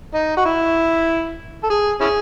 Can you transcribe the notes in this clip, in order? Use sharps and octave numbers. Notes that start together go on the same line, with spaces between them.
D#4
F#4
E4
A4
G#4
C#4 E4 G#4